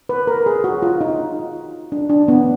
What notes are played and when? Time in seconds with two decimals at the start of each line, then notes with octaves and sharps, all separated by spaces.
0.09 B4
0.27 A#4
0.46 G#4
0.64 F#4
0.82 F4
1.01 D#4
1.92 D4
2.09 D4
2.28 B3